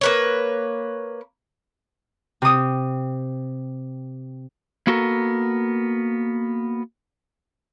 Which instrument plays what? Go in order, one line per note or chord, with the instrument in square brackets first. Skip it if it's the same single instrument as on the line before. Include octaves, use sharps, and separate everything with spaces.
[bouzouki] A#3 B4 C#5
[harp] C3 D#6
[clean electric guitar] A#3 B3 F#4 A4 A#4